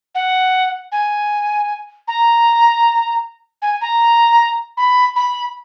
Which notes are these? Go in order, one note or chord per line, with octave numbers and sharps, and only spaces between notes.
F#5
G#5
A#5
G#5
A#5
B5
B5